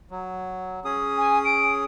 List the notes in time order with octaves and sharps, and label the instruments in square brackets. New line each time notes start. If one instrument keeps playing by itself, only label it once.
[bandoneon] F#3
C#4 G#4 D#6
[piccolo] G#5
D7